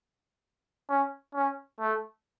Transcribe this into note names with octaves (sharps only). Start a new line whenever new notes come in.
C#4
C#4
A3